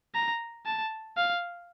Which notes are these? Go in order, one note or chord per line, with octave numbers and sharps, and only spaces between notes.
A#5
A5
F5